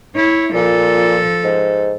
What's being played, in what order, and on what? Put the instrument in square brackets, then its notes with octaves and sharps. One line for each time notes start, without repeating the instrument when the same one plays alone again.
[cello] E4 C#5
[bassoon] A#2 [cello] F3 A4
[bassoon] G#2